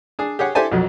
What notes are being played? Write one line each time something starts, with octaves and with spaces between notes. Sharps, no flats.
D4 G#4
G4 G#4 C#5 F#5
E4 G4 A4 C5 G#5 A5
B1 F2 F#3